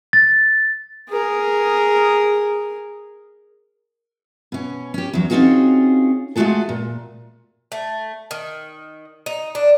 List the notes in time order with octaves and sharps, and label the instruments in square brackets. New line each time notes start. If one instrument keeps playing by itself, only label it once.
[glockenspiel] A6
[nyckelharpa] G#4 A#4
[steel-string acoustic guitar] B2 C#4
C#4 G4
E2 F#3
C4 C#4 D#4 F4 F#4 G#4
G#3 A3 F4 F#4 G#4 A4
A#2
[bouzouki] A3
D#3
D#4
D4